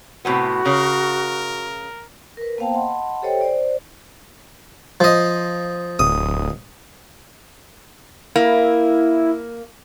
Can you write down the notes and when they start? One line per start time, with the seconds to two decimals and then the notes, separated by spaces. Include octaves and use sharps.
0.25 A2 C3 B3 F#4
0.66 C#3 A#4
2.37 A#4 B4
2.58 A#3 B3 C5 F5 G5 A5
2.74 D#5 F#5 A5 B5 C6
3.22 G4 A4 C5 C#5 D#5 G5
3.41 C5 D5
5.00 F3 D#5
5.99 D1 D#6
8.36 A#3 E4